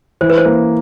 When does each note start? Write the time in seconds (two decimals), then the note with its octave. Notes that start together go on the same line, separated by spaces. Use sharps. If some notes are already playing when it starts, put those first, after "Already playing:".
0.21 E3 C5
0.30 B4
0.38 C5
0.45 A#3